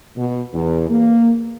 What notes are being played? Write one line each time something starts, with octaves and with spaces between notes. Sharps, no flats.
B2
E2
A#3